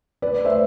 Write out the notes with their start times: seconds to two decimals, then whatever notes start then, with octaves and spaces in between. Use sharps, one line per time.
0.22 B4 D5
0.45 C5 E5